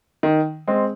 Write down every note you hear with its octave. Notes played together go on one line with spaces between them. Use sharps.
D#3
G#3 C4